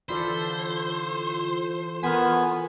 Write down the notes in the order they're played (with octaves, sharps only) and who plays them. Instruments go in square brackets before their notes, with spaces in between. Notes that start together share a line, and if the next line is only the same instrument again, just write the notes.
[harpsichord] D3 B5 [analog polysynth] E3 F4 A4 [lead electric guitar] C5
[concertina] B3 G#5 [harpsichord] A#4 B4